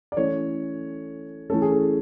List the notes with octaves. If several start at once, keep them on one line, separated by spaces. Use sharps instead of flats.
D5
E3 A3 C#4 C#5
E3 A3 C#4 A4
G#4
A4